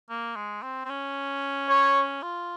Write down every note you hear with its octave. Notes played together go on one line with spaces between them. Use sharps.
A#3
G#3
C4
C4
C#4
C#5
F4